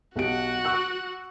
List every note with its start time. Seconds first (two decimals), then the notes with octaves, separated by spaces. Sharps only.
0.16 B1 F#4 G4 F#5 D7
0.65 C#6 E6 F#6